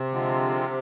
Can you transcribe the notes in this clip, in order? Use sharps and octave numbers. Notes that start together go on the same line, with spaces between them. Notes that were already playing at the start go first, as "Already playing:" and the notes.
Already playing: C3
D3 F3 G#3 C4 F4